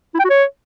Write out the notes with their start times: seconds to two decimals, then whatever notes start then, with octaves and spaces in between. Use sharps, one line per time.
0.14 E4
0.20 G5
0.25 F#4
0.30 C#5